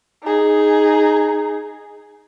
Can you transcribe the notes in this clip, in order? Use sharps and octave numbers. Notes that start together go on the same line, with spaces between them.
D#4 G#4